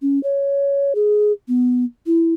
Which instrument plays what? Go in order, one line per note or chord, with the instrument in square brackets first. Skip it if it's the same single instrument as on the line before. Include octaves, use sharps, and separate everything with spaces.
[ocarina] C#4
C#5
G#4
B3
E4